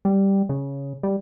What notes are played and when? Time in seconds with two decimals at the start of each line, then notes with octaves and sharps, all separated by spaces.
0.05 G3
0.49 C#3
1.03 G3